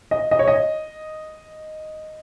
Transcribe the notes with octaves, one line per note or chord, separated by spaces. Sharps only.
D#5
D#5
C#5
D#5